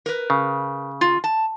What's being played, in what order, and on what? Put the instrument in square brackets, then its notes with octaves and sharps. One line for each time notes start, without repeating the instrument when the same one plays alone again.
[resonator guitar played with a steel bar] A#4 B4
[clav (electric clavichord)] C#3
[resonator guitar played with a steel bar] F4
A5